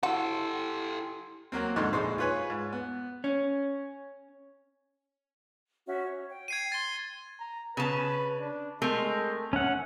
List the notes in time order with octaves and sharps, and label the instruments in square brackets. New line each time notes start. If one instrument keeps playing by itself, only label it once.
[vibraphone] E4 C6 [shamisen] F#4 [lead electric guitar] G4 A4
[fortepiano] F#3 A#3 C4
F2 G#2 D3 D#4 C6 C#6
A#1 G#3 D#4 C5
F4 G#4 B4 C#5 G#5
G#2
B3
[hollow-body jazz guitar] C#4
[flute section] C#4 F#4 E5
C#5
G5
[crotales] G#6 C7 D#7
[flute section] C6 [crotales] A6 G7
[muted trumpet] A#5
[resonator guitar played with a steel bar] C#3 A5 [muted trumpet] B4
[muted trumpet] D4
[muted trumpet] G#3 [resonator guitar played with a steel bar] A3 C4 A#4
[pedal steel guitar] C#4 F#5 [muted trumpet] E5